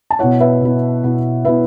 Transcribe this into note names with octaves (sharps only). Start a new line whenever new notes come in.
A5
B2 B3 E4 C#5 F#5
B4 E5
B2 B3 E4
B2 B3 E4
B2 B3 E4 B4 E5